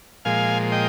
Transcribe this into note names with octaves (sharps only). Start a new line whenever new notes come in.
A#2 F3 G#3 F5 G#5
D#5 G5